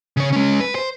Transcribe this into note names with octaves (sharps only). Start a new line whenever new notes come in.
C#3 C#5
G#3 C#4
B4
C5